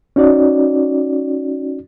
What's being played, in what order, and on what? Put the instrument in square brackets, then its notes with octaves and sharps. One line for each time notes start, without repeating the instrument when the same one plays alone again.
[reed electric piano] C#4 D#4 F#4 D5